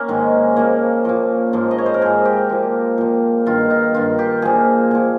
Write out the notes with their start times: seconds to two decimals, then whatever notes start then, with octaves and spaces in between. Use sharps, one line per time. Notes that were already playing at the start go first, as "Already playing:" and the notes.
Already playing: A#3 C#4
0.08 G#2 D#3 G#3
0.56 A#2 F3 A#3
1.05 A#2 F3
1.53 G#2 F3 A#3
1.71 D#5
1.78 C#5
1.86 C5
1.94 A#4
2.01 G#2 F3 G#4
2.25 G4
2.49 A#2 F3
2.98 A#2 F3
3.46 G2 D#3 F4
3.70 D#4
3.94 G2 D#3 F4
4.19 G4
4.42 A#2 F3 G#4
4.91 A#2 F3